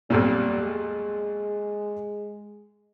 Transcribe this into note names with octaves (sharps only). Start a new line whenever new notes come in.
B1 F2 A#2 G3
G#3